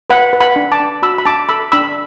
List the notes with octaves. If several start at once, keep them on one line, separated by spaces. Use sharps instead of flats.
B4 F#5 B5
B4
F#5 B5
D4
A5 D6
D4
F#4 B5 E6
B5
D4 A5 D6
A4 B5 E6
D4 B5 E6